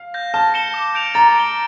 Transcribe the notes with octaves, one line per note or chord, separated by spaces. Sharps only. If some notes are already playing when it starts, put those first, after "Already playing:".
Already playing: F5
G6 A#6
A5 F6
C#7 E7 G7
D6
G6 D7 F7
A#5 A6
D7 G7